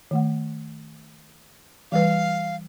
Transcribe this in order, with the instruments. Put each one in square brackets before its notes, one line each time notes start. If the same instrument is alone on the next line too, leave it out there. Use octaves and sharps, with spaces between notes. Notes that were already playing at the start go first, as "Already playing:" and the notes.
[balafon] D#3 A3 F#5
[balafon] E3 G3 B4 [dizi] F5